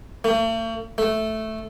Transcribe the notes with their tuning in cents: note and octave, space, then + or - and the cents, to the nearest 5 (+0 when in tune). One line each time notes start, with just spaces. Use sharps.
A3 +45
A3 -5